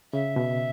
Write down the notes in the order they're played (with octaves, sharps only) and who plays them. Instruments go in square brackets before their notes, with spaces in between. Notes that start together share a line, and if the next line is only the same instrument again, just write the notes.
[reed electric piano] C#3 [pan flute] E5
[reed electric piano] B2